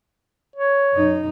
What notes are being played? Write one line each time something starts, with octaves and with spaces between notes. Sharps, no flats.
C#5
F#2 D#4